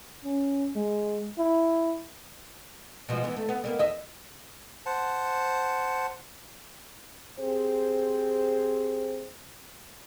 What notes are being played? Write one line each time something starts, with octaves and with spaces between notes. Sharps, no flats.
C#4
G#3
E4
B2 F3 G#3
E3 B3
A3
B3
G3 A#3 B3
E2 D#5 E5
C5 F#5 A5
C4 G4 G#4 C5